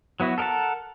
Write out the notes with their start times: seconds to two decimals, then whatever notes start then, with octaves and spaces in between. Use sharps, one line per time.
0.20 F#3 B3 E4 F#4
0.38 A4 A#4 D#5 F#5 A5